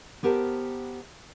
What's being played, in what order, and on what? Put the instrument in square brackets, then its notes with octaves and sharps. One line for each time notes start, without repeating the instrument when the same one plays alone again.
[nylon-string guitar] B3 G4 A#4 C5 A5